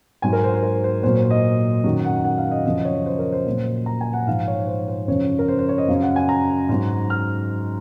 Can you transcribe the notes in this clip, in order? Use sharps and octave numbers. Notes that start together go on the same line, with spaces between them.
G#2 F#3 G#5
A#4
C5
C5
A#4
C5
A#2 F#3 C5
C5
D#5
F#2 D#3 F#3
F#5
F#5
F5
D#5
F#2 C#3 F3 D#5
D#5
C#5
C5
A#4
C5
A#2 F#3
A#5
G#5
F#5
G#2 F3 F5
C#5
C5
C5
F#2 C#3 F3 C#5
A#4
C5
C5
C#5
D#5
F#2 C#3 F#3 F5
F#5
G#5
A#5
G#2 F#3
F6